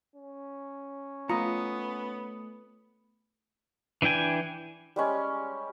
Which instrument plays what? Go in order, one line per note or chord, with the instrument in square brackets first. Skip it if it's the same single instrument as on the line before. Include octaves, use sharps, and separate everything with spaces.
[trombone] C#4
[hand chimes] A3 D#6 C#7 [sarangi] B3 [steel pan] F4 A#5
[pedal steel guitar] E3 D4 E4 G5 G#5
[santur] G3 G#3 C#4